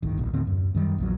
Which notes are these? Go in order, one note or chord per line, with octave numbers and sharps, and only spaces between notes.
D1 G1 D#3
D1 A#1
D#2 A2 D3 C4
F#2
F#2 D#3 G3
A#1 E2 F#3